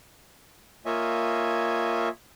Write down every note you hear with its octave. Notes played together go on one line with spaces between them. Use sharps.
A#3 F4 C#5 D#5 E5 G#5